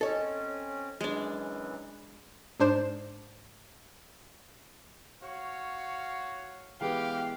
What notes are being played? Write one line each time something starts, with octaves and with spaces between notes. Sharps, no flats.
C4 C#4 A4 C#5 D#5
F#2 E3 G#3 D4
G#2 D4 C5 E7
F#4 C#5 F5
E3 G#3 B3 G4 F5